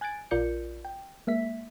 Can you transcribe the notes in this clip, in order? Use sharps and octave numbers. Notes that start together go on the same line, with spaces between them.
G#5 F#6 G#6 A6 D7
A#1 F4 A#4 D5 G6 C#7
G5
G#3 A#3 E5 B6